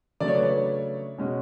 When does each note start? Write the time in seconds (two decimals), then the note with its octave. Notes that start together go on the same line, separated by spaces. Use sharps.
0.20 C#3 F#3 A3 D4 D5
0.28 C#5
0.35 B4
0.43 C#5
1.18 B2 G#3 C#4